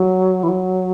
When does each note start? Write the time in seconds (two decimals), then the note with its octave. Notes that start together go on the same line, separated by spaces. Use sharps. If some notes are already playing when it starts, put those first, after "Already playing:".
Already playing: F#3
0.43 E3
0.49 F#3